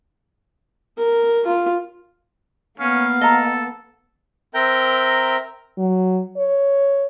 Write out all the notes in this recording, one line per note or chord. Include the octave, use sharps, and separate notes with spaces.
A#4
F4
A#3 B3 C#4 F5
A4 D#5 A#5
C4 A#4 E5 G5 A#5 G6
F#3
C#5